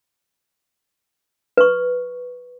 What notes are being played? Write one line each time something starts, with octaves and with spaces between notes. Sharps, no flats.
B4 C#6